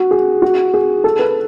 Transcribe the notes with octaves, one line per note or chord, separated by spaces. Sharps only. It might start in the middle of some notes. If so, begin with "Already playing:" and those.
Already playing: F#4
G#4
F#4
G#4
A4
B4